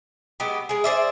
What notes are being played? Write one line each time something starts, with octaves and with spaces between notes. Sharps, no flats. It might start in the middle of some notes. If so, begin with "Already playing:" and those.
F#3 G#3 B3 G4
G#3 G#4
G#4 C5 D5 E5